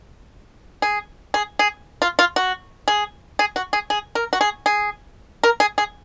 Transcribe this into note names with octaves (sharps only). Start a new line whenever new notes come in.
G#4
G#4
G#4
F4
F4
F#4
G#4
G#4
F#4
G#4
G#4
A#4
F#4
G#4
G#4
A#4
G#4
G#4